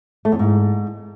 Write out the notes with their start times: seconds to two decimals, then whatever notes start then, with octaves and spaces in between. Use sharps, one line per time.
0.25 A3
0.32 E2
0.39 G#2